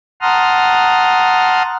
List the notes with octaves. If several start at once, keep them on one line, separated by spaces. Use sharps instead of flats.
F#5 A5 A#5 C6 D#6 F6